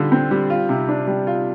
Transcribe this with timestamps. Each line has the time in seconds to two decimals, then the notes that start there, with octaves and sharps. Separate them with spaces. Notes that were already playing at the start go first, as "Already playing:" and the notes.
Already playing: D3 G3 F4
0.12 C4
0.31 G3
0.50 F4
0.69 C3
0.89 D4
1.07 G3
1.27 F4